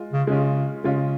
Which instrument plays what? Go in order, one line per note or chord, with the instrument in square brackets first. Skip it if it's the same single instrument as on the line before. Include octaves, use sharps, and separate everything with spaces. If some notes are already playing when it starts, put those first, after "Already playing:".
Already playing: [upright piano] G#3 F4
[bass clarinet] C#3
[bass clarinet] C#3 [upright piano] G#3 C#4 F4
[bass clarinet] C#3 [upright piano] G#3 C#4 F4